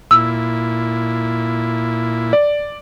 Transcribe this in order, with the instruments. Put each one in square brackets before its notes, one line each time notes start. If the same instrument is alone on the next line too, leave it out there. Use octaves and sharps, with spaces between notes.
[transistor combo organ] A#2 E4 [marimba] E6
[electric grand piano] D5